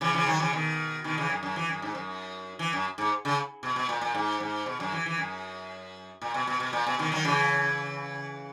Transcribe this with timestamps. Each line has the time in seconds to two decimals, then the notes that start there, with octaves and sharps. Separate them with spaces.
0.01 C#3 E3
0.14 C#3 E3
0.26 D#3 F#3
0.39 C#3 E3
0.53 B2 D#3
1.04 B2 D#3
1.17 C#3 E3
1.30 F#2
1.43 F#2
1.56 E3
1.69 F#2
1.82 G#2
1.95 F#2
2.59 E3
2.73 F#2
2.98 G#2
3.25 C#3
3.63 B2
3.76 B2
3.89 A#2
4.01 A#2
4.15 G#2
4.40 G#2
4.66 B2
4.80 F#2
4.92 E3
5.06 E3
5.18 F#2
6.22 A#2
6.34 B2
6.47 B2
6.60 B2
6.73 A#2
6.87 B2
6.99 B2 D#3
7.12 D#3 F#3
7.25 C#3 E3